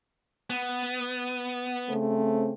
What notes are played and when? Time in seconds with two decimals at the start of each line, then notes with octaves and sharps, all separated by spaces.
0.50 B3
1.88 C#3 A3 C4